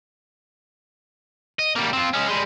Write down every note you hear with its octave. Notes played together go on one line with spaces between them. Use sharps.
D#5
G3 A#3
C4 F4
G#3 C#4
G3 G#3